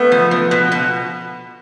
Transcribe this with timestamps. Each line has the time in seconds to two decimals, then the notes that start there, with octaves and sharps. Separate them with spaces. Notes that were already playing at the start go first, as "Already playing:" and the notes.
Already playing: A3 B3
0.12 F3
0.31 F3
0.51 B2
0.72 B2